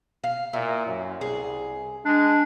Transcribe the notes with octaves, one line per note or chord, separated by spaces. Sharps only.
F5
A#2 E4
F#2
C2 G#4
G#3 D4